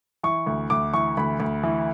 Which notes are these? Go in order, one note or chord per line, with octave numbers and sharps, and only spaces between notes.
E3 C#6
D2
D2 D6
E3 C#6
D2 B5
D2
E3